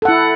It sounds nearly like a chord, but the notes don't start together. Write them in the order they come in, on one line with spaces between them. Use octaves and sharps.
A4 F#5 E4